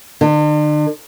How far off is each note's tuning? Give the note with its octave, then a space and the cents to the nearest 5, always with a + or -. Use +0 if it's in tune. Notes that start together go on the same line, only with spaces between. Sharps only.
D3 +45